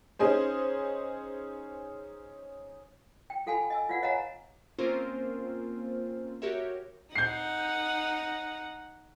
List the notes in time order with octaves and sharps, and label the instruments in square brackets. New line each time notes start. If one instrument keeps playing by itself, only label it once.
[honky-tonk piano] C#4 D#4 G#4 C5
[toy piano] G5
F4 A4 F5 G#5 B5
D#5 G#5 E6
F4 B4 D5 F5 F#5
C#5 D#5 F5 F#5 G#5 A#5
[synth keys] A#3 C4 C#4 F4 A#4 C5
F#4 G4 A#4 C#5 E5
[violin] D#4 F#5 [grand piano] G6 C7